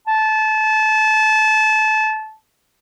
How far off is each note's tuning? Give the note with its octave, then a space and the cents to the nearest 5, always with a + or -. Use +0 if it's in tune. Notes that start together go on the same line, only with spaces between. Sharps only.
A5 -25